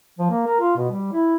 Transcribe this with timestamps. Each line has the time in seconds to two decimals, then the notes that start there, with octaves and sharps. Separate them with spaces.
0.19 F3
0.30 A#3
0.47 A#4
0.60 F4
0.77 B2
0.91 G3
1.13 E4